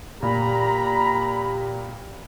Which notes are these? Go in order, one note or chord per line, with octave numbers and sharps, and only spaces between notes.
A#2 G4 A#5 B5